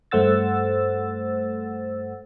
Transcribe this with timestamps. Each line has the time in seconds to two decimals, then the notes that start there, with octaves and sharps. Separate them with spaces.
0.11 G2 A3 C5 F#5 E6 A6